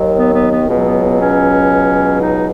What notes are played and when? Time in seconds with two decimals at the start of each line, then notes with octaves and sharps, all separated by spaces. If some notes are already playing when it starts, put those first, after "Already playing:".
Already playing: D#2 D#3 F#3
0.16 B3
0.33 B3
0.50 B3
0.67 C#2 B2 F#3 B3
0.84 B3
1.01 B3
1.18 C#4
2.20 D#4